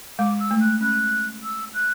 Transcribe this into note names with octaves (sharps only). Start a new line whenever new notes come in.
G#3 D6
E6
A3
F#6
C#4 F#6
E6
F#6